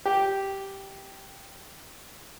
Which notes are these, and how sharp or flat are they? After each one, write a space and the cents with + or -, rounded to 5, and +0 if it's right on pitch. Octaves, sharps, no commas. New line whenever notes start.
G4 -5